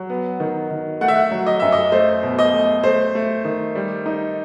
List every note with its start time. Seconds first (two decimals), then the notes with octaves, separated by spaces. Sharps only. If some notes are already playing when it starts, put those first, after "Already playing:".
Already playing: F#3
0.10 B3
0.40 D#3
0.70 D#3
1.01 A3 F#5
1.08 E5
1.15 F#5
1.31 F#3
1.47 D#5
1.60 F#2 E5
1.72 D#5
1.92 A3 C5
2.23 B2
2.39 D#5
2.53 A3
2.84 A3 C5
3.15 A3
3.45 D#3
3.75 G3
4.06 D#4